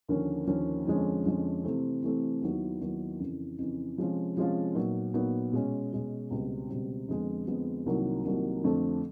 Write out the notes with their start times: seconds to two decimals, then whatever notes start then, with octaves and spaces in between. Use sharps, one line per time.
0.09 D#2 D3 F3 A#3 C#4
0.47 D#2 D3 F3 A#3 C#4
0.86 F2 D3 F3 G#3 C#4
1.26 F2 D3 F3 G#3 C#4
1.64 C3 E3 A3 C4
2.02 C3 E3 A3 C4
2.42 D#2 D#3 F#3 B3 E4
2.81 D#2 D#3 F#3 B3 E4
3.20 F2 C#3 E3
3.58 F2 C#3 E3
3.97 C3 F3 G#3 C#4 F4
4.36 C3 F3 G#3 C#4 F4
4.75 A#2 F#3 B3 D#4
5.14 A#2 F#3 B3 D#4
5.53 B2 G#3 C#4
5.92 B2 G#3 C#4
6.31 C#2 B2 G3 C4
6.69 C#2 B2 G3 C4
7.09 F2 D3 F3 G#3 B3
7.47 F2 D3 F3 G#3 B3
7.86 C2 C3 D#3 F#3 A#3
8.25 C2 C3 D#3 F#3 A#3
8.64 F2 D3 F3 A3 C4